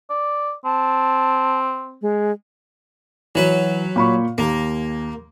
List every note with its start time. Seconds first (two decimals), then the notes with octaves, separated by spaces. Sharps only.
0.10 D5
0.65 C4 A5
2.02 G#3
3.35 E3 F#3 B4
3.96 A#2 B5 C#6
4.38 D#2 A#3